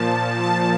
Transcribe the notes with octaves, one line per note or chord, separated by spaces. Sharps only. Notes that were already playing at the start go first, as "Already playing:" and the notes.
Already playing: A#2 F3 A5
A5